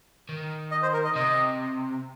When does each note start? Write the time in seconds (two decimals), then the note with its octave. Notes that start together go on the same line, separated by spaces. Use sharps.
0.29 D#3
0.71 D#5
0.82 C5
0.93 A#4
1.05 D#5
1.15 C3 D#5